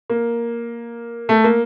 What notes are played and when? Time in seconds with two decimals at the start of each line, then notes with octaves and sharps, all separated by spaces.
0.10 A#3
1.29 A3
1.44 A#3